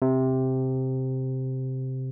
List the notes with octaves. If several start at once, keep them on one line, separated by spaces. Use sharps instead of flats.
C3